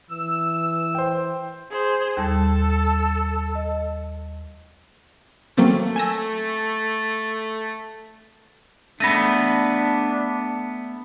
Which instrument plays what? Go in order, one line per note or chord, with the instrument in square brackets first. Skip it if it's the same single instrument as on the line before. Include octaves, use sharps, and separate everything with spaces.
[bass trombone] E3 [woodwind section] E6
[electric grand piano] C5 G5
[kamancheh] G#4 C5
[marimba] D#2 G3 A5 [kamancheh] A4
[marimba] D#5
[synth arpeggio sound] F#3 A#3 C4 [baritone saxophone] A3
[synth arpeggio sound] G#5 E6 A#6
[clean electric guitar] A3 B3 [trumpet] D4 [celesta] B5 A#6 D#7